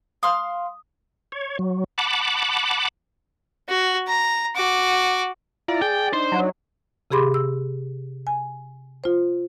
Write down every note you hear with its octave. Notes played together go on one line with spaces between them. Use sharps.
F5 C6 D#6 F6
C#5
F#3
F#5 A5 B5 D6
F#4
A#5
F#4 D6
E4 F4 D5 A#5
G#4 G5
D4 D#4 C5
F#3
C3 G4 G#4 B5 C6 D6
E6
G#5
F4 C5